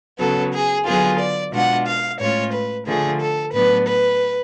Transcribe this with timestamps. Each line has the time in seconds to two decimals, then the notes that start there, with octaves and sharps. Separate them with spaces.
0.19 C#3 F#3 B3 A4
0.53 G#4
0.86 D3 F#3 B3 F4 G#4
1.19 D5
1.53 B2 G#3 D4 F4 F#5
1.86 F5
2.20 A2 G#3 C#4 F4 C#5
2.53 B4
2.86 D3 F3 A3 G#4
3.20 A4
3.53 A2 F#3 B3 D4 B4
3.86 B4